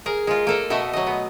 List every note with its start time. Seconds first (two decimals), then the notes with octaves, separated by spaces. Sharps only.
0.06 G#4 A#4
0.27 G#3 F4
0.47 A#3 A4 A#4
0.70 B2 A3 D#5 E5
0.93 F#3 D#5
1.07 B3